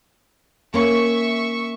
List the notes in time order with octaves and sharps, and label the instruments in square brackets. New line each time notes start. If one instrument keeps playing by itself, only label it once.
[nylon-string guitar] A#3 C#4 [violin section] E5 C#6